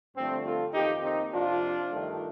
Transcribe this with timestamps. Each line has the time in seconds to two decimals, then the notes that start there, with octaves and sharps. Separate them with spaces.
0.15 G2 D3 F3 A3 C4
0.44 F4 A4
0.73 F2 D#3 A#3 D#4 G4
1.03 C4 D#4
1.32 F2 C3 F3 D4 F4
1.90 G2 D#3 A3